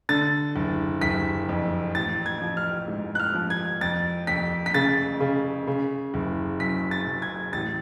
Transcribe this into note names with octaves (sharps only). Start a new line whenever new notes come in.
D3 A6
F#1
F#1 B6
F2
A1 A6
G#6
F3
F6
G#2
F#6
F6
F3
G#6
F2 A6
F2 B6
B6
C#3 A6
C#3
C#3
F#1
F#2 B6
A6
F#2
G#6
A1 A6